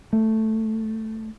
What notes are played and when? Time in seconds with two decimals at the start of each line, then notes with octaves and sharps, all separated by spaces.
0.13 A3